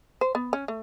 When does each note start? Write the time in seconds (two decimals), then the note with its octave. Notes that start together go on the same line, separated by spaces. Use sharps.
0.21 C5
0.35 B3
0.53 C#4
0.68 A3